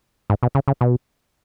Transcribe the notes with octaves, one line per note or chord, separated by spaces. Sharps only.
G#2
B2
C#3
C#3
B2